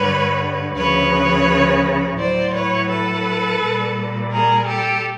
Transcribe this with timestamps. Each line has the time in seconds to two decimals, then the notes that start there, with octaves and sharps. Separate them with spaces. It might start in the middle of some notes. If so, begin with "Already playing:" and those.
Already playing: G2 D3 G3 B4 C#5
0.75 D2 C#3 F3 B4 C#5
2.17 A2 F#3 C5 D5
2.53 B4 C#5
2.88 A4 B4
3.60 A#2 G3
4.31 G#4 A#4
4.67 G4 A4